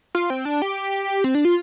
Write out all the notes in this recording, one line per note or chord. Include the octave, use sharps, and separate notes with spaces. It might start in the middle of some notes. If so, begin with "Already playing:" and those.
F4
C4
D4
G4
C4
D4
F4